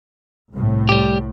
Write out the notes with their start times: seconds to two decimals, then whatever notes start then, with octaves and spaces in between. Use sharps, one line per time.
0.53 C2 A2
0.89 G3 G4